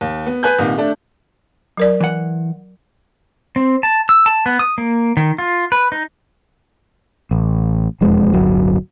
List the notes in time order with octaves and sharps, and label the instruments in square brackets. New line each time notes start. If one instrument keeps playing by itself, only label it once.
[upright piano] D#2
B3
B4 G#5 F#6 G6
C2 A#2 D#3
A3 D4
[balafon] F#3 A#4 D5
[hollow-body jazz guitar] E3 F#5
[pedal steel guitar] C4
A5
E6
A5
B3
D#6
A#3
D#3
F4
B4
D#4
[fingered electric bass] A1
E1 F2 G#3
D1 G1 F#3